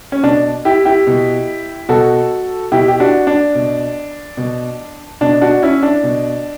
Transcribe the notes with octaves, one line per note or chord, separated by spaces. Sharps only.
C#4
B2 D4
E4 G4
E4 G4
B2
B2 F#4 A4
B2 E4 G4
G4
D4 F#4
D4
B2
B2
B2 D4
D4 F#4
C#4 E4
D4
B2